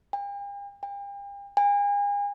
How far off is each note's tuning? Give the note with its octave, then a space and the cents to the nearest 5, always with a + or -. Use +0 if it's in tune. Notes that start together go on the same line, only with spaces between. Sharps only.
G5 +45
G5 +40
G#5 -40